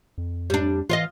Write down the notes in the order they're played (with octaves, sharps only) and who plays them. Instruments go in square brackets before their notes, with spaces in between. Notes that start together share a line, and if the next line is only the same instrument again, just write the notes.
[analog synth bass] F2
[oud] G3 D4
[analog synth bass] E3 [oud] F4 D5 D#5